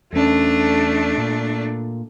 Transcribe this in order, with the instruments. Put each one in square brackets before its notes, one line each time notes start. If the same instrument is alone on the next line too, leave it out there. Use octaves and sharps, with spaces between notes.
[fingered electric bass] E2 C#4 [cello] A3 D4
[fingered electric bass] A#2